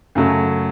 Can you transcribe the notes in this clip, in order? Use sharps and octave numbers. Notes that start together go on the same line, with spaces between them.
F#2 C#3 F#3 A3